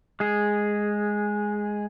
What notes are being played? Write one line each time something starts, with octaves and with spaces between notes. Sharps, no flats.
G#3 G#4